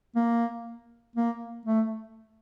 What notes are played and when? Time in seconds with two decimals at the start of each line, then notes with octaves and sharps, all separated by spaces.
0.16 A#3
1.16 A#3
1.66 A3